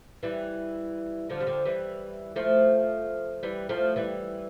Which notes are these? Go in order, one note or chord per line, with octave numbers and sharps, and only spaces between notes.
E3 G3
D3 F3
G3
D3 F3
E3 G3
F3 A3
E3 G3
F3 A3
E3 G3